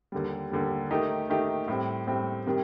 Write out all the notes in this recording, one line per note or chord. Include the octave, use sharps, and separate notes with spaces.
D#2 D3 G3
D#2 D3 G3
D#3 A3 D#4 G4
D#3 A3 D#4 G4
A2 G3 C4
A2 G3 C4
C3 D#3 G3